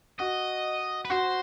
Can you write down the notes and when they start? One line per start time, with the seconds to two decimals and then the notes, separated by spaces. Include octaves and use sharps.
0.19 F#4 D#5
1.05 B4
1.10 F#4 C5